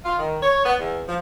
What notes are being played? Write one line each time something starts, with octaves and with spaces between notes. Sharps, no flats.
F4
D#3
C#5
B3
E2
F3